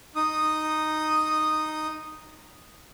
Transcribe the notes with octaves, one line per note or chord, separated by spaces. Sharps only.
D#4 D#6